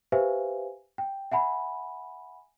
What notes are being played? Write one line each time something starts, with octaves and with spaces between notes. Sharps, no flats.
G4 B4 C5 E5 F5 G#5
G5
E5 F#5 G#5 B5